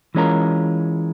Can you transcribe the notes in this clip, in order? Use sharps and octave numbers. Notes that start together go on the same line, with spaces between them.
E3 G#3 C#4 F4 A#4